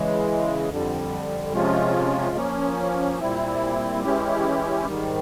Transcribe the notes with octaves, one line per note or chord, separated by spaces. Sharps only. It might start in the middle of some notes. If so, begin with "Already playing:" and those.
Already playing: C#3 E3 G#3
F2 D3 G3
C3 F3 G#3 C#4 F4
F3 A#3 C#4
A#2 G3 C4 E4
E3 G#3 C#4 E4 G4
G#2 D#3 G3